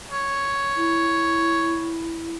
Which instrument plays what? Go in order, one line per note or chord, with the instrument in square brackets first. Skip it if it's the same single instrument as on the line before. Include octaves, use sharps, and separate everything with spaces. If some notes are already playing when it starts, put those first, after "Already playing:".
[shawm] C#5
[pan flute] E4